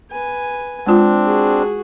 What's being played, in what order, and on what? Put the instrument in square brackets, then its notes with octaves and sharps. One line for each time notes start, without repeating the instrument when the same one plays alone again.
[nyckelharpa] B4 G#5
[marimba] G#3 F4 [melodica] C4 D4
[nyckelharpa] F#4 G#4